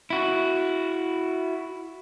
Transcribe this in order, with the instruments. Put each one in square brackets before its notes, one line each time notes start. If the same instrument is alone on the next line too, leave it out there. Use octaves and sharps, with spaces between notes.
[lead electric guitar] E4 F#4